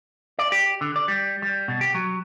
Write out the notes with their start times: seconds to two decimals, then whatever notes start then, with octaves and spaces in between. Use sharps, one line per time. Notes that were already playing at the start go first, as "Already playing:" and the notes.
0.39 D5
0.52 G4
0.81 D3
0.96 D5
1.08 G3
1.42 G3
1.68 B2
1.81 G4
1.94 F#3